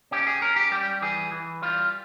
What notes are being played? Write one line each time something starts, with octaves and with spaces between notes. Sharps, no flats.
C#4 G4
G#4
C#4 A#4
G4
G3 G4
E3 G#4
E3
G3 F4